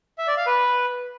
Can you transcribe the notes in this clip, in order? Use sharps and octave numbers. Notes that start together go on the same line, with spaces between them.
E5
D5
F5
B4